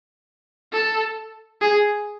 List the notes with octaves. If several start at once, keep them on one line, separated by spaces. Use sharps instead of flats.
A4
G#4